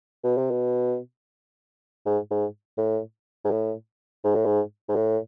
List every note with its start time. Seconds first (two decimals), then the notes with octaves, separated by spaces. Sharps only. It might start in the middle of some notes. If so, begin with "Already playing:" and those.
0.24 B2
0.37 C3
0.51 B2
2.06 G#2
2.31 G#2
2.78 A2
3.44 G#2
3.51 A2
4.24 G#2
4.35 A2
4.45 G#2
4.89 G#2
4.96 A2